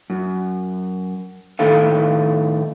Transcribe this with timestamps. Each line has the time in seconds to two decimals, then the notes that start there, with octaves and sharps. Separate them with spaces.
0.10 F#2
1.59 A2 D#3 D#4 A4 F5